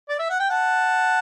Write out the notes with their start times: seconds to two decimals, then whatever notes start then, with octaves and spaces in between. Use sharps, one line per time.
0.09 D5
0.19 E5
0.30 F#5
0.40 G5
0.49 F#5 A5